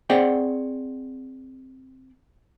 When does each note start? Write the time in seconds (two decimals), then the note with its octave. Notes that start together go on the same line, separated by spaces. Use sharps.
0.10 C4 G#4 D5 F#5 G5